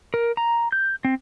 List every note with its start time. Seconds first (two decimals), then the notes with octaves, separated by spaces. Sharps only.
0.14 A#4
0.37 A#5
0.72 G6
1.05 C4